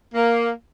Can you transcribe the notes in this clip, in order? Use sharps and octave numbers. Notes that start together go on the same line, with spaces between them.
A#3